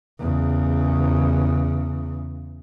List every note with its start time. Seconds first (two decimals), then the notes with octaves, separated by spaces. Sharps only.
0.19 E2 C#3